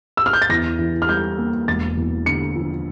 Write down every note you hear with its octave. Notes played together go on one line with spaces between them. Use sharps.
E6
F6
G6
A6
E2 A#6
E3
F6
G3 G6
A#3
E1 A6
E2
D3 C#7
F3